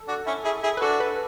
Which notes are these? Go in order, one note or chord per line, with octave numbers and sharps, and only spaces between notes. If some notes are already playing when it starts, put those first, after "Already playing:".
Already playing: A4
D4 F#4
C#4 E4
E4 G#4
E4 G#4
B4
D4 F#4 A4
B4